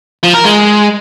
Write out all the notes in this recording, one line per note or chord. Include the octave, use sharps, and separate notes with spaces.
F3
A#4
G#3